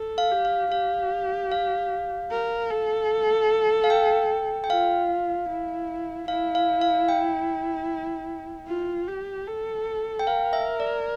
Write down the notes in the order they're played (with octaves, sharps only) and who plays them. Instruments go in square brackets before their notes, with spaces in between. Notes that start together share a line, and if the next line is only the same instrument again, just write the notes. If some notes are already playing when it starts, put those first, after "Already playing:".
Already playing: [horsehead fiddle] A4
[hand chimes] F5
[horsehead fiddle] G4
[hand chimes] F5
[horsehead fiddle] G4 [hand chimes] F5
[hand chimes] F5
[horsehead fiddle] A#4
A4
[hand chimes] F5
G5
G5
[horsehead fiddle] F4 [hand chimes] F5
[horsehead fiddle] E4
[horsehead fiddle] E4 [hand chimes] F5
[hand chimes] F5
F5
G5
[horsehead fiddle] F4
G4
A4
[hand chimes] G5
[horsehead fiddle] A#4 [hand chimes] F5
[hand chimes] E5
D5